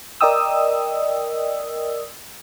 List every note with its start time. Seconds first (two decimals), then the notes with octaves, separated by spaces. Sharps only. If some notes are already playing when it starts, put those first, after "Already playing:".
0.21 A#4 D5 D#5 G5 D#6 E6